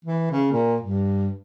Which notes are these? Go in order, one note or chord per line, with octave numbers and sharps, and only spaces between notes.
E3
C#3
A#2
G2